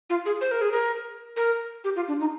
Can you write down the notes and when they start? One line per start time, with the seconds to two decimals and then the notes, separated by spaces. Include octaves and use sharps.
0.10 F4
0.26 G#4
0.41 C5
0.51 A#4
0.61 G#4
0.72 A#4
1.37 A#4
1.84 G4
1.96 F4
2.08 D4
2.20 D#4